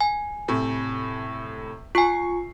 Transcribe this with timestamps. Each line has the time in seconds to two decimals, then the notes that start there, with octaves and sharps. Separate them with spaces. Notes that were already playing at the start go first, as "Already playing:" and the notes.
0.01 G#5
0.48 A2 C3
1.95 F4 G#5 C#6 C7